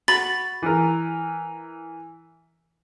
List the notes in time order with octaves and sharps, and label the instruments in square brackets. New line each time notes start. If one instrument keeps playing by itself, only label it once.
[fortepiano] F#4 [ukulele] B5 [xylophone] A6
[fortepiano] E3 A#4